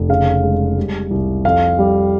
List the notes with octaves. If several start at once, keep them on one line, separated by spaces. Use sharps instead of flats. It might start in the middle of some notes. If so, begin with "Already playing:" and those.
Already playing: F1
C#3 F5
G#3
G3
C2
F2 F5
G3